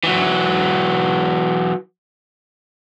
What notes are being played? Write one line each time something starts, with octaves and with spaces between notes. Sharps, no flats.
E3 F#3